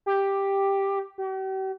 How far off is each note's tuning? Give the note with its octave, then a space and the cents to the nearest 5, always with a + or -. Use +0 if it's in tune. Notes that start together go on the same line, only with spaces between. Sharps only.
G4 +5
G4 -45